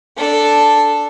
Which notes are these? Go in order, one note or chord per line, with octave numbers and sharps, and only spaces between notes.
D4 A4